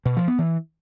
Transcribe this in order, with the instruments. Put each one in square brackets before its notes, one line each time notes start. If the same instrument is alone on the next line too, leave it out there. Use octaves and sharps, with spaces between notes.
[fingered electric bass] B2
F3
B3
E3